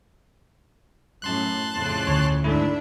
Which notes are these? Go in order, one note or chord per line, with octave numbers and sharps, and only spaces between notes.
F#2 A2 A5 C6 F#6
F2 A2 C#3
D2 C#5
G#2 A3 D4 E4 E5